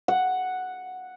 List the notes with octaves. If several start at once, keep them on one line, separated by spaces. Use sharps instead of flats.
F#5